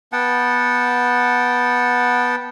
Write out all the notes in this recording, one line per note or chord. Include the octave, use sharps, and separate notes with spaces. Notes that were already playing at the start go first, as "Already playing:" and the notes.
B3 F#5 G5 A5